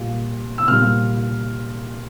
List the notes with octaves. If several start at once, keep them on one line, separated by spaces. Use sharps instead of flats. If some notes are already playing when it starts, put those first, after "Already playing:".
Already playing: A#2 G3
E6
A#2 G3 F6